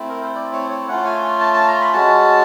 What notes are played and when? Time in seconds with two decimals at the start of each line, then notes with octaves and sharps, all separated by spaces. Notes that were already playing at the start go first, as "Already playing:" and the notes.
Already playing: A3 C4 E4
0.09 A#4
0.22 C5
0.35 D5
0.53 C#5
0.70 C#5
0.88 A3 C#4 F4 F#5
1.05 G#5
1.40 A5
1.54 A5
1.67 A#5
1.81 B5
1.93 G#3 C#4 F#4 A5